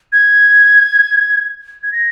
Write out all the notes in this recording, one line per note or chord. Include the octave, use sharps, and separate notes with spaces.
G#6
G#6
A#6